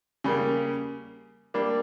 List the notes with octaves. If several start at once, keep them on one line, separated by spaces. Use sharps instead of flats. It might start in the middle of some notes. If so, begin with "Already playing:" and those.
C#3 G3 A#3
G3 A#3 D4